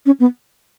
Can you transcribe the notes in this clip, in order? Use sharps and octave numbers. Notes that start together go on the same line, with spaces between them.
C#4
B3